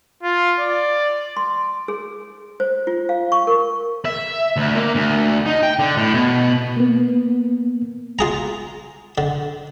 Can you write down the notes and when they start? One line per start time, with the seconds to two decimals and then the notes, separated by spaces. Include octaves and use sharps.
0.23 F4
0.60 D5
1.37 C6
1.88 G#4
2.60 C5
2.87 F4
3.09 F5
3.32 C#6
3.47 A#4
4.05 E5
4.56 D2
4.75 A#3
4.95 D2
5.46 D#4
5.63 G5
5.79 D3
5.97 A2
6.14 B2
6.77 A#3 B3
8.19 F4 G#4 A#5
9.18 D3